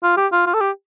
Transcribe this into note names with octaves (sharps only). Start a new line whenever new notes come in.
F4
G4
F4
F4
A4
G4